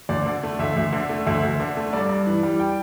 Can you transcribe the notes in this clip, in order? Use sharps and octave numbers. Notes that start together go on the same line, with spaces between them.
D2 D5
D3
A3
D2 E5
D2
D3
A3
D2 E5
D2
D3
A3
G2 D5
G2
E3
G3
G5